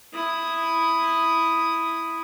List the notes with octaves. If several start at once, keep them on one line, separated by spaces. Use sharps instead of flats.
E4 D#6